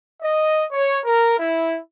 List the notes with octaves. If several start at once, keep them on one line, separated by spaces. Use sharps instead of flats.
D#5
C#5
A#4
E4